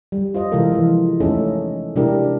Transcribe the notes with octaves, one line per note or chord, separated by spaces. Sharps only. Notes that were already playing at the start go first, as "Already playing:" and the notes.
G3
F4 C5 D#5
C3 E3 G#3 F4 A4 A#4
E3 F3
G#3 A3 C#4 D#4 G#4 A4
C3 G#3 D4 E4 G4 A#4